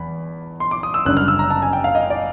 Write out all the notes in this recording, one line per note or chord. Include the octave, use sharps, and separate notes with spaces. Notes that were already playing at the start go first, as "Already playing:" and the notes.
Already playing: E2 B5
C6
D6
D#6
E6
F#1 F#2 D3 G3 F#6
F6
E6
A#5
A5
G#5
G5
F5
D#5
D5